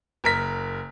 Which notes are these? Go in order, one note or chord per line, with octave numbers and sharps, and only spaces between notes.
F#1 A#4 B6